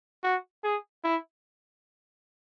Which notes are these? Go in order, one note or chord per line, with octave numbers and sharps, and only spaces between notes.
F#4
G#4
E4